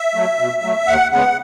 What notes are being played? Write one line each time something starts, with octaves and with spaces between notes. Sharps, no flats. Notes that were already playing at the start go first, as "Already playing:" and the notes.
Already playing: E5
F#3 A3
B2
F#3 A3
D#2 F#5
C#3 G#3 B3 F#5